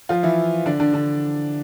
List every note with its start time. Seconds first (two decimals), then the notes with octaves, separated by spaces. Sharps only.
0.09 F3 F4
0.23 E3 E4
0.66 D3 D4
0.80 D3 D4
0.93 D3 D4